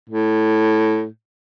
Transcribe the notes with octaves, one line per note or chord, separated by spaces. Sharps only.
A2